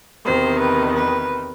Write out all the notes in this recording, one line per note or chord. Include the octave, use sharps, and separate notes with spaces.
E2 C3 D#3 C5
B4
B4